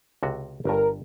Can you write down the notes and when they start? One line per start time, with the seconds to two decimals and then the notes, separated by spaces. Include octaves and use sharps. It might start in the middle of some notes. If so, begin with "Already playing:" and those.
0.23 C#2 C3 F#4
0.65 G1 G2 A#4